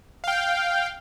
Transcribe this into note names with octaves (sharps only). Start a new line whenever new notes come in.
F5 G5